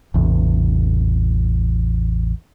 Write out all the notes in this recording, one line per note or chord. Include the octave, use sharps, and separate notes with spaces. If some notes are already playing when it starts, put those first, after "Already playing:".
A1 E2 C3